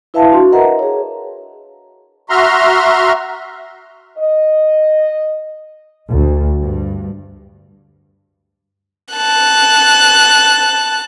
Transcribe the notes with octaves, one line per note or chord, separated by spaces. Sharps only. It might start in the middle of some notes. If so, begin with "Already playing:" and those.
E4 B4 E5 F5 A5
D4 F#4 C6
A#4 B4 D#5 E5 F#5 A#5
G#4 C#5
F#4 E5 A#5 C6 F6
D#5
D2
G2
A5 F#6